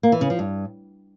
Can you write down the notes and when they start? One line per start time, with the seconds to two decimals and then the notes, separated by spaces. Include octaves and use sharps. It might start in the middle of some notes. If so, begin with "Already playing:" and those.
0.03 A#3
0.12 E3
0.21 C#3
0.30 F3
0.39 G2